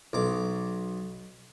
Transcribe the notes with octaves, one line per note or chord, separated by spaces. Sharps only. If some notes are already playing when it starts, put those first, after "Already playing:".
B1 D6